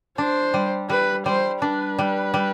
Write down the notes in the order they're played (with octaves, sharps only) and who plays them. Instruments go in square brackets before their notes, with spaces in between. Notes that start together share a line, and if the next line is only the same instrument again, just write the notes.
[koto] D4 [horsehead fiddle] C5
[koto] G3
[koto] G3 [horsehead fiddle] B4
[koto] G3 [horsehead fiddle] C5
[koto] D4 [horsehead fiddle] B4
[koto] G3
G3